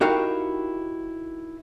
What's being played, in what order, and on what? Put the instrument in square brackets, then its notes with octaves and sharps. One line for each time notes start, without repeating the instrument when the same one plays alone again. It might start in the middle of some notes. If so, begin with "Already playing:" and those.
[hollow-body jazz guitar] D#4 E4 F#4 G4 A#4 F5